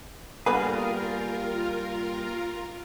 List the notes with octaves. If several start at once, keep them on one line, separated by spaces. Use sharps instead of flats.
D3 G3 A#3 B3 F4 G#4 A#4 B4